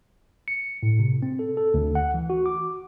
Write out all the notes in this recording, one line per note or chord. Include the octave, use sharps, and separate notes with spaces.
C#7
A2
C3
C4
A4
A4
D2
F#5
E3
F#4
D6